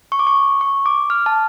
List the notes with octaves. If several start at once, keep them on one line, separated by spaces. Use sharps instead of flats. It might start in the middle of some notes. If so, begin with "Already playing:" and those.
C#6
D6
C#6
C#6
D6
F6
A5